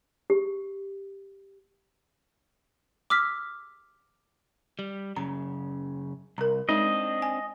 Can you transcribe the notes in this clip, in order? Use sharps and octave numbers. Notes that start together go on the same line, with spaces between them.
G4
D6 E6 F6 B6
G3
F#2 C#3 A#5
C2 A#4 A#5
G#3 C4 D4 D#4 D#5
G#5